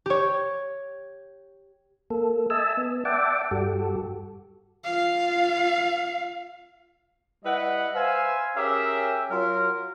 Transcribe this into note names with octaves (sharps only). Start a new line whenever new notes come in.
G4 C#5
A#3 A4
D#5 E5 G#5 A5 E6
B3
D5 E5 F#5 G5 A5 D6
G2 F#4 G4 A4
F4 F5
G3 E4 B4 D#5 F#5
B4 C5 E5 F5 G#5
C#4 G4 G#4 A#4 E5
F#3 F4 A#4